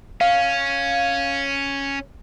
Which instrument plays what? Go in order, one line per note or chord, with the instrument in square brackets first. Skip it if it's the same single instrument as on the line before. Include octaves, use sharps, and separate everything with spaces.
[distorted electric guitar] C#4 [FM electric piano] F5